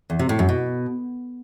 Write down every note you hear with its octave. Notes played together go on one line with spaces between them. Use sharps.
E2
C3
A2
F#2
B2